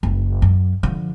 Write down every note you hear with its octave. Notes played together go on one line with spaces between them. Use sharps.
F#1
F#2
D3 F3